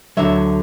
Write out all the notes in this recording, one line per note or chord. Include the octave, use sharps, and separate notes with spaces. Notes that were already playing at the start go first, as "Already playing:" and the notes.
D2 D3 F#3 E5